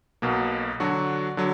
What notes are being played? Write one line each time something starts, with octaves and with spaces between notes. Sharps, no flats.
B1 B2 A#3
D3 F#3 D4 F#4
D3 F#3